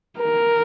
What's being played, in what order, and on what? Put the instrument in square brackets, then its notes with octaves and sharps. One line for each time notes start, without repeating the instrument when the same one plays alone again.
[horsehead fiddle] A#4